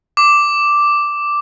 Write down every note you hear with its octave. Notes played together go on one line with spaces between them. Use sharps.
D6